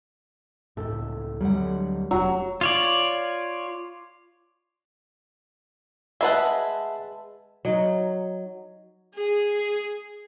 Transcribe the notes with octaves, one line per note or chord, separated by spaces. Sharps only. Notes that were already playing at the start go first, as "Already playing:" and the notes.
C#2 A2 A4
D2 F#3 G3 F#5
F1 F#3
F4 C#5 D5
G#3 B4 E5 F#5 A5
F#3 D#4
G#4